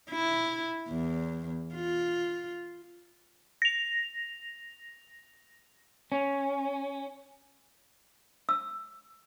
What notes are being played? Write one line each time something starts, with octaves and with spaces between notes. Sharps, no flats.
E4
E2
F4
A#6 F7
C#4
E6